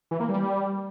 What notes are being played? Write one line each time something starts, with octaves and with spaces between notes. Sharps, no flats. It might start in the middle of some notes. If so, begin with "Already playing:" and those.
E3
A#3
G3